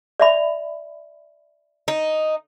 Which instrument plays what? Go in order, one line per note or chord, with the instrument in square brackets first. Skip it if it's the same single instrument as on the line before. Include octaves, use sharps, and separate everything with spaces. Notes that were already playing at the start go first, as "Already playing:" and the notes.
[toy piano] D5 E5 B5
[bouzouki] D#4